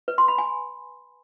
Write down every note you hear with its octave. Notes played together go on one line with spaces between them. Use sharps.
B4
C6
B5
G#5